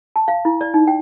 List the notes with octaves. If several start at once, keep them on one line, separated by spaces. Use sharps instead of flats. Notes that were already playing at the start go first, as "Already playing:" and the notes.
A5
F5
E4
D5
D#4
G5